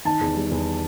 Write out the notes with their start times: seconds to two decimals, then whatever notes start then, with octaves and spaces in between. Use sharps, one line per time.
0.05 D#3 A5
0.21 E2
0.36 G3
0.51 E2